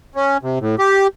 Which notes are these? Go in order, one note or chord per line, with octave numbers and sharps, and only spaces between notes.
C#4
C3
A2
G4